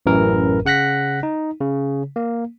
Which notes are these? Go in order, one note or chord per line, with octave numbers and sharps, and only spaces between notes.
A1 F#2 E3 A#4
C#3 F#5 F#6 A#6 B6
D#4
C#3
A#3